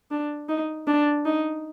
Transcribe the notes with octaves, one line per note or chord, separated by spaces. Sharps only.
D4
D#4
D4
D#4